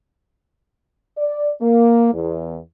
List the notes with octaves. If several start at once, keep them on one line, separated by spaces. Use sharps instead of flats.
D5
A#3
E2